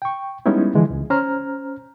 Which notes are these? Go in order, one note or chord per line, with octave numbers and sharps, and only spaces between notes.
G5 C#6
G3 G#3 B3 C#4 D#4 E4
D3 E3 F3 G#3
C#2
C#4 C5 A#5 F6